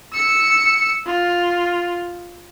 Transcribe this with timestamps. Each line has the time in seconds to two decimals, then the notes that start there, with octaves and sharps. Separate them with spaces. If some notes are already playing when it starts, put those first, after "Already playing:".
0.13 E6 C#7
1.06 F4